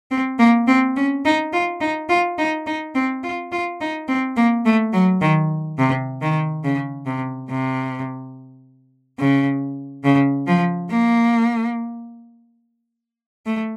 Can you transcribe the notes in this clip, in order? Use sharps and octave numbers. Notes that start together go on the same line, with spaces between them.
C4
A#3
C4
C#4
D#4
F4
D#4
F4
D#4
D#4
C4
F4
F4
D#4
C4
A#3
A3
F#3
D#3
C3
D#3
C#3
C3
C3
C#3
C#3
F3
A#3
A3